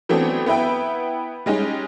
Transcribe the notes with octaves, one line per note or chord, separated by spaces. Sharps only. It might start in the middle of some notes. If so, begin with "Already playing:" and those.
E3 F#3 A3 B3 C4 D4
B3 E4 B4 E5 G5
G3 G#3 C#4 D#4